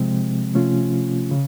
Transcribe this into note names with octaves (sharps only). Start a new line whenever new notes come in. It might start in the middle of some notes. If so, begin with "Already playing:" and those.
Already playing: C3 F3 G#3 C4
C3 F3 A3 C#4 F4
C#3